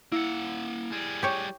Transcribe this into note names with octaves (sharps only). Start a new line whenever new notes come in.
A#3 E4 F#5
G3 G#4
G4 C#5